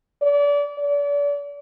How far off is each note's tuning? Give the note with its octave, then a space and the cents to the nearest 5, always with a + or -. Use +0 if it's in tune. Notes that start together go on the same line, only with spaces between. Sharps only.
D5 -30
D5 -35